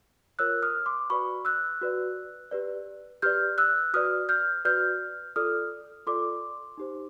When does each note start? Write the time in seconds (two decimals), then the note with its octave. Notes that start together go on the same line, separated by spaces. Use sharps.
0.39 F4 A#4 C#5 E6 F#6
0.63 D#6 F6
0.86 C6 D6
1.10 F#4 B4 D5 B5 C#6
1.45 E6 F#6
1.81 F#4 B4 D5
2.51 G4 B4 D5
3.22 G4 B4 D5 F6 G6
3.58 E6 F#6
3.94 F#4 B4 D5 D#6 F6
4.29 F6 G6
4.65 F#4 B4 D5 F6 G6
5.36 F4 A4 D5 D#6 F6
6.07 F4 A4 D5 C6 D6
6.78 D#4 G4 C5